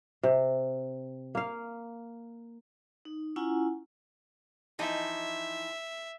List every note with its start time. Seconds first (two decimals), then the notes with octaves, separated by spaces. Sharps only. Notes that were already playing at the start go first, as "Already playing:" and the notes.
0.23 C3
1.35 A#3 F5
3.05 D#4
3.36 C#4 E4 F4 F#5 G#5 A#5
4.79 E3 F3 D#4 E5